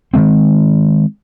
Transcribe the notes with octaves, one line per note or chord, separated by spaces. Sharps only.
D#3 F#3 G#3 C4